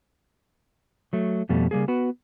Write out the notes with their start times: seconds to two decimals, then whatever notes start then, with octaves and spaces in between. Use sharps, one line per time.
1.13 F#3 A3
1.49 F2 B2 G3 A3
1.71 C#3 G3 A#3 G#4
1.88 B3 F#4 B4